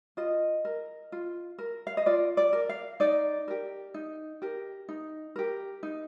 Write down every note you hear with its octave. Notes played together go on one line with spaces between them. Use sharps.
F4 D#5
A#4
F4
A#4
F5
D#5
F4 D5
D5
A#4
F5
D#4 D5
G4 A#4
D#4
G4 A#4
D#4
G4 A#4
D#4